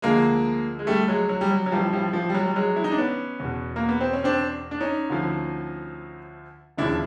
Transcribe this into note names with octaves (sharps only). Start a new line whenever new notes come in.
D2 D3 F3 G#3 A#3
G#3
G3 A3
F#3 G#3
F#3
G3
F#3
F#3
A1 A2 E3 F3 G3
F3 G3
F3
G3
F#3
G3
F#3 G#3
E4
D#4
D4
B3 C#4
E2 B2
A#3
B3
C4
C#4
C4 D4
D4
C#4 D#4
D2 D3 F3
E1 D#2 C#3 F3 D4 E4